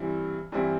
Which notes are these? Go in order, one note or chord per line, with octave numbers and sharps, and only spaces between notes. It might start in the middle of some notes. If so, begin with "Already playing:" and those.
Already playing: G2 E3 G3 C4 E4
G2 E3 G3 C4 E4